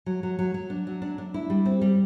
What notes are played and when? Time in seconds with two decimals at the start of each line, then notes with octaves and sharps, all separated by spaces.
0.06 F#3
0.23 F#3
0.39 F#3
0.54 F#3
0.70 D4
0.87 F#3
1.02 D4
1.18 D4
1.34 E4
1.50 G3
1.66 C4
1.82 G3